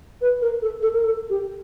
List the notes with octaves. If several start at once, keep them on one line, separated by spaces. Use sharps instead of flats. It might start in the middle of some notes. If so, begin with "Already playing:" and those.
B4
A#4
A4
A4
A#4
A4
G4